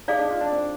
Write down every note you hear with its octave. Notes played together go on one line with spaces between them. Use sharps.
D#4 G#4 D5 F5
D4
F4
D4
C4